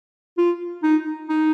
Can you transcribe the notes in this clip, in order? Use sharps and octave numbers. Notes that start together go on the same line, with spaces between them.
F4
D#4
D#4